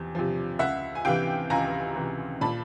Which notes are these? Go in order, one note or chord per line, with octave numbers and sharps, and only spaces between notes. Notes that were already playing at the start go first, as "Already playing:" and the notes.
Already playing: E2 C3 F3
C3 F3
C#2 E5 F#5
G#5
C3 E3 F5 G5
C#2 G#5 A#5
C3 E3
A#2 A5 B5